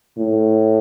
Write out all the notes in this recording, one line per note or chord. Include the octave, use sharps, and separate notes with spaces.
A2